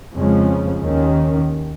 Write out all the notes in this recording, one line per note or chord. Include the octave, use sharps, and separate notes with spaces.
F2 C#3 F3 G#3 C#4
D#2 D#3 C#4